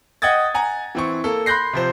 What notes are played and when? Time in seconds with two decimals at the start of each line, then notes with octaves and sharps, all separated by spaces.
0.22 D#5 F#5 G5 D#6 G#6 A6
0.54 F#5 G#5 A#5
0.95 E3 C4 C#6
1.24 A#3 A4
1.46 B5 C6 F#6 G6 A#6 C7
1.73 C3 F3 C5